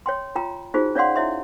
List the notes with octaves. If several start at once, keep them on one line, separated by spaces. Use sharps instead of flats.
C#5 G5 C6
F4 G5 A#5
D#4 F4 F#4 G#4 C5
C#4 C#5 D5 F5 F#5 C6
E4 C#5 E5 C6